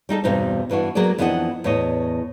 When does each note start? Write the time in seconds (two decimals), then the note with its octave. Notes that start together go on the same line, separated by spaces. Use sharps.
0.09 G3 D#4 G#4 A4
0.24 E2 G2 B2 C4 D#4
0.70 G2 E3 D4 F#4
0.95 F#3 A#3 B3 G#4 D5
1.18 F2 E3 B3 D4 D#5 F#5
1.64 E2 A2 C#5 D#5